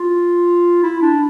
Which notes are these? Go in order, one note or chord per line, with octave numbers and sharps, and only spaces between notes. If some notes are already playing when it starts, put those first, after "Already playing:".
Already playing: F4
E4
D4